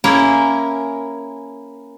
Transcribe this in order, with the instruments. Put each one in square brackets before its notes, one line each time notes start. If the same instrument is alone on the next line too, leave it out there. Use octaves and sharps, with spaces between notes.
[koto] A#3 C#4 E4 G#4 A#4